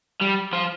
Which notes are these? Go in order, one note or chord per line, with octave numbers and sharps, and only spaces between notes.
G3
F3